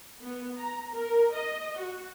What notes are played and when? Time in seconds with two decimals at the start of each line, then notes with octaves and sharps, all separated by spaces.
0.20 B3
0.59 A#5
0.92 A#4
1.33 D#5
1.78 F#4